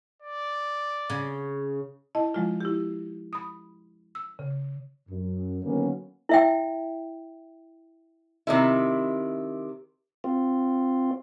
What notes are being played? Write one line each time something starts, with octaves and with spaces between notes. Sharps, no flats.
D5
C#3
E4 D#5 A5
F3 G#3 F4
E4 G4
B5 D#6
E6
C#3
F#2
D3 D#3 F#3 A#3 B3 C#4
E4 E5 G5
C3 D#3 E4
C4 F4